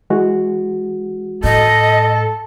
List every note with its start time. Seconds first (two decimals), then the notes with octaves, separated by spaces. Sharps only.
0.10 E3 G#3 F#4
1.44 A2 A4 D#5